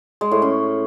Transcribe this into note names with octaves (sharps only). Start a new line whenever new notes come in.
G#3
A2
C#4